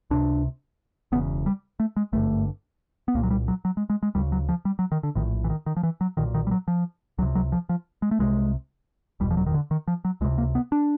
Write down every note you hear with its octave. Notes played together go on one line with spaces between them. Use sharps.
C#2 C3 D4
E1 E2 C#3 B3
G3
A3
G#3
G#1 G2 D3 A3
B3
C2 A#2 A#3
F#3
G3
F#3
F#3
G#3
G#3
G#3
D2 C#3 G3
F#3
F3
G3
F#3
D#3
D3
A#1 A2 D#3
E3
D#3
D#3
F3
E3
F#3
B1 A#2 D#3
D#3
G3
F#3
F3
C#2 C3 F#3
F#3
F3
F3
G#3
A3
C2 C3 G#3
F#1 E2 B2 G3
F3
F#3
D#3
D3
D#3
F3
F#3
C#2 C3 G#3
A#3
B3
D4